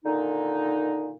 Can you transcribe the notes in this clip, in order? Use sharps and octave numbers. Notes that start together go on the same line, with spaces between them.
A#2 D3 D#3 D#4